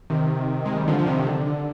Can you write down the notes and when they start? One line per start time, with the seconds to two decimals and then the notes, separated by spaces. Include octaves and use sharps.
0.10 C3 D#3
0.66 G#3
0.77 G3
0.88 D3 F3
0.99 F3
1.07 C3 D#3
1.26 D3
1.46 D3